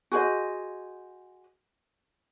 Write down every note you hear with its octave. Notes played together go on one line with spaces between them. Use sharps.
F#4 G#4 C5 D#5